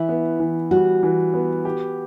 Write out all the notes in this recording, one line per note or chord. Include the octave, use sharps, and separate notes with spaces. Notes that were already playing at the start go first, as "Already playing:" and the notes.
Already playing: E3 E4
B3
E3
G3 F#4
E3
B3
G4